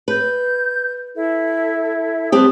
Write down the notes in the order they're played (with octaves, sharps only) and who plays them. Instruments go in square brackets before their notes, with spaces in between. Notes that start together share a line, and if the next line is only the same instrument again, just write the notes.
[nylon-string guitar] B4 [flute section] G6
[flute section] E4 A4 E5
[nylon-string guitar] G3 C4 G4 [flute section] B4 A5 D#6